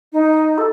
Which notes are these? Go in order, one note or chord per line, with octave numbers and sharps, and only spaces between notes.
D#4
A4